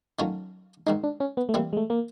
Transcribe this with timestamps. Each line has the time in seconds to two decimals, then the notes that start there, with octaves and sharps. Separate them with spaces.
0.19 D#3 F#3 A3 C#4 F4
0.86 G#2 D#3 G#3 D#4
1.03 D4
1.20 C#4
1.37 B3
1.49 A3
1.54 E3 G3 A#3 C4 E4
1.73 G#3
1.77 A3
1.90 A#3